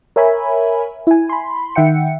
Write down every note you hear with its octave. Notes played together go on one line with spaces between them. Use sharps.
A#4 C#5 E5 G#5 B5
E4 G#5
B5 C6
D#3 E5 F#5 G5 C#7